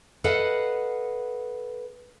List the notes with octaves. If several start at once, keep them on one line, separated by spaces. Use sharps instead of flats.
A4 B4 D#5 F5 F#5